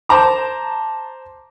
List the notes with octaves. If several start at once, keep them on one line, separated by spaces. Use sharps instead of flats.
C5 A5 A#5 D6